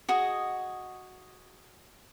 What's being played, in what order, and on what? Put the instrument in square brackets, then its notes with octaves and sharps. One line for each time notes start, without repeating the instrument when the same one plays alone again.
[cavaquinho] F#4 G#4 D#5